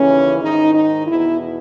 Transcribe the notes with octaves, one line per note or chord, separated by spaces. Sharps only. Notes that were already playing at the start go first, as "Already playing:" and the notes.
Already playing: D#2 C#3 E3 C#4
G#2 D#3 D#4
D#4
E2 B2 E4